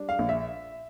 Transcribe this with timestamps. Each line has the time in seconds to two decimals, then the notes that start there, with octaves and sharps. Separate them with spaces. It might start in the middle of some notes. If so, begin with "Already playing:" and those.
Already playing: G3 D4
0.09 F5
0.19 A#1
0.29 E5